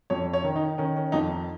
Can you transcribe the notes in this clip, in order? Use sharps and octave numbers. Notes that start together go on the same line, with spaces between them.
F2 C#5
C#5
D#3
D#4
D#3 C#4
C#4
F2 D#4